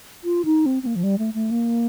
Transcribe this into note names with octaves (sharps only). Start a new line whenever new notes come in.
F4
D#4
C4
C4
A#3
F3
G3
A3
A3
A#3